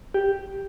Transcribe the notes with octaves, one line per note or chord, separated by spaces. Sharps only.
G4